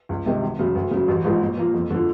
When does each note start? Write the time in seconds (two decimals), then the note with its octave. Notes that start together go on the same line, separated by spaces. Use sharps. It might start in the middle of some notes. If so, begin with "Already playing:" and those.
0.09 C#2
0.26 C3 D#3 G#3
0.42 G#1
0.59 F#2 C#3
0.75 D2
0.91 C#3 F#3
1.08 A1
1.25 G#2 F3 G#3
1.41 A#2
1.57 F3 A#3
1.74 F2
1.90 D3 F3